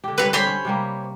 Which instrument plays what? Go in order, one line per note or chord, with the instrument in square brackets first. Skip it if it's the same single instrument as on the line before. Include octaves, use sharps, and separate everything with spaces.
[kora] D3 G4
[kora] D3 G3 C4 [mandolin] B4 C#5
[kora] G3 [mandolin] C5 C#5 B5
[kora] C#4
C3 G3 A#3